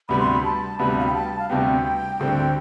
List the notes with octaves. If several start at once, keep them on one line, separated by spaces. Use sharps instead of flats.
D2 C3 G3 B3 B5
C6
B5
A5
D2 C3 G3 B3 B5
F5
G5
A5
F5
D2 C3 G3 B3 G5
D2 D3 G3 C4